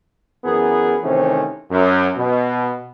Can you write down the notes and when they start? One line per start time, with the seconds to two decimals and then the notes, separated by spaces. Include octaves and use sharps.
0.44 F#2 E3 B3 G#4 A#4
1.03 C3 D#3 E3 A3 C4 C#4
1.70 F#2
2.17 B2